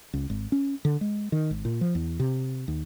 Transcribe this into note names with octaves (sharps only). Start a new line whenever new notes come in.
C#2
G#1
C#4
D3
G#3
D#3
G#1
A#2
F3
E2
C3
D#2